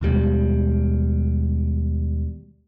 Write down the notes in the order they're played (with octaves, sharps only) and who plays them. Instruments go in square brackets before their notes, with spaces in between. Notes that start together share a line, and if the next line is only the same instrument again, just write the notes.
[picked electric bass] D#2 B2 G3 G#3